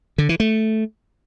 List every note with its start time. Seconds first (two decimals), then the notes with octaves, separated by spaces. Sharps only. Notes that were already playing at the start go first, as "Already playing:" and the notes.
0.18 D3
0.29 E3
0.40 A3